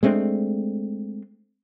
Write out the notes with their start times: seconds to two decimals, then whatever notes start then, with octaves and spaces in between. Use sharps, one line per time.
0.03 G#3 A3 C4 D4